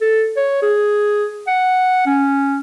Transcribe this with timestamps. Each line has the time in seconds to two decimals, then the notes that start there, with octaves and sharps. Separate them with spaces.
0.01 A4
0.37 C#5
0.62 G#4
1.47 F#5
2.06 C#4